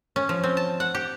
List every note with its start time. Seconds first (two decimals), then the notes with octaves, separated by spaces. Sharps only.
0.16 C#4
0.29 F3
0.44 C4
0.57 A5
0.80 F#5
0.95 G4